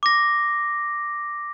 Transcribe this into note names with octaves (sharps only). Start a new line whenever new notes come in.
D6 A#6